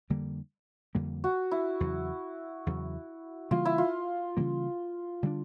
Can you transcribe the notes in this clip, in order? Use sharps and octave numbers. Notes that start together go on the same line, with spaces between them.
F2 D3 G3 A#3
F2 D3 G3 A#3
F#4
E4
E2 C#3 F#3
E2 C#3 F#3
C#3 E3 G3 A#3 F4
E4
F4
C#3 E3 G3 A#3
D3 G3 A#3 D4